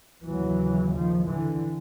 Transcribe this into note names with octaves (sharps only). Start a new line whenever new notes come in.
D#2 C#3 E3 F#3
D#3 F3
D3 E3